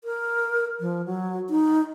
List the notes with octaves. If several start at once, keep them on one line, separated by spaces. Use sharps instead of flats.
A#4
F3
F#3
D#4